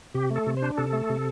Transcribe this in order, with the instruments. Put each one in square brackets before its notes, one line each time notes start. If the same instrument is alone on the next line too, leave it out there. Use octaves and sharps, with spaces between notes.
[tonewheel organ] C3 G4
A3
A4
C3
C5
D4
C3 A4
A3
C3